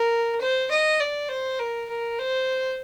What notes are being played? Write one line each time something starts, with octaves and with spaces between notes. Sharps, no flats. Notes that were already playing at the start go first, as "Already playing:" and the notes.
Already playing: A#4
C5
D#5
D5
C5
A#4
A#4
C5